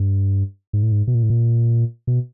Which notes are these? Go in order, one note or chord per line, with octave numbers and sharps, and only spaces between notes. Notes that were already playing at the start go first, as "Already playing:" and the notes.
Already playing: G2
G#2
A2
G#2
B2
A#2
A2
A#2
B2